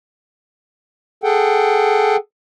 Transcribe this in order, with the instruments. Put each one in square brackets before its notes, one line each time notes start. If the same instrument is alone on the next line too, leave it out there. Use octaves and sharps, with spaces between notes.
[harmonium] G#4 A4 F#5 G5